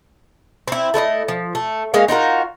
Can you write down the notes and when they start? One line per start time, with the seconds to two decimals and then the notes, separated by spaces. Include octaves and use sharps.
0.68 C4 E4
0.94 A3 E4 F4 D#5
1.28 F3
1.55 A3
1.94 G#3 A#3 C#4 F5
2.08 D#4 F4 F#4 A#4